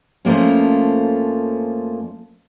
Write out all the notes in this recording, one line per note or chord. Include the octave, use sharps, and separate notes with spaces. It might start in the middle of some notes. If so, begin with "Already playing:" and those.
F2 F3 A3 A#3 C#4